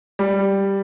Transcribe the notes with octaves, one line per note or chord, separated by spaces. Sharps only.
G3